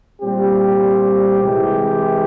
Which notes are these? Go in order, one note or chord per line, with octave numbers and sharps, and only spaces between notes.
A#2 G3 C4 G4
C3 E3 G#3 E4 G4